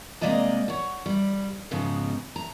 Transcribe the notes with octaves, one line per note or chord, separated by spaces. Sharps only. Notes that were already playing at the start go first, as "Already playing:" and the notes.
C3 G#3 A#3 D5 D#5 A#5
C#5 F#5
G3
G#2 C#3 F3 B3 D#4
A#5